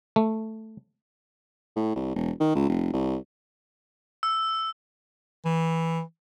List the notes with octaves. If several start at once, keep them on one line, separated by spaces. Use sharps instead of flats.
A3
A2
C2
E1
D#3
C#2
F1
C2
E6
E3